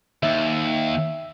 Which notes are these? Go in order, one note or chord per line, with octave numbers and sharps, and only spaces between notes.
D#2 E5